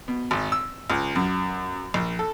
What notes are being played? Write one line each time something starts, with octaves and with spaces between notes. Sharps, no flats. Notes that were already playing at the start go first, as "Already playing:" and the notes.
B2
G#1
E6
C#2
F#2
A#1
A4